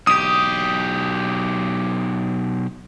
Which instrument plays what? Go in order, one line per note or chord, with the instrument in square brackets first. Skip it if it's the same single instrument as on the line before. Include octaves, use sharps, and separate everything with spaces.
[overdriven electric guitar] B1 G4 [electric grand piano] D#6